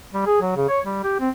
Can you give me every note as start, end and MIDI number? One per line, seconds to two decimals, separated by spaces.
0.14 0.24 55
0.26 0.41 68
0.41 0.53 54
0.56 0.67 49
0.69 0.80 73
0.85 0.99 55
1.03 1.17 67
1.20 1.29 60